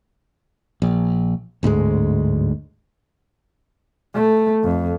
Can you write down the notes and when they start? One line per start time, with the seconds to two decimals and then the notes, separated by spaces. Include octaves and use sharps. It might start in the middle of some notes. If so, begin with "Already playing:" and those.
0.82 A#1
1.63 D1 D2 G#2 G#3
4.14 A3
4.64 F2